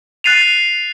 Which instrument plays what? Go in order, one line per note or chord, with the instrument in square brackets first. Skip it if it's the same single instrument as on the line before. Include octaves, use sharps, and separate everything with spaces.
[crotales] F#6 A6 C7 D#7 F7